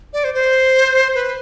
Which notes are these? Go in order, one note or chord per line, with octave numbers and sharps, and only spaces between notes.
D5
C5
C5
B4